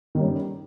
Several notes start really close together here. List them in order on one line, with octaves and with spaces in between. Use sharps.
D#3 G3 C#4